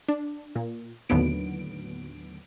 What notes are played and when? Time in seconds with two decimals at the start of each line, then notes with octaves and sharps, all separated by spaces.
0.08 D4
0.55 A#2
1.09 D#2 A2 D3 F#3 B3 D7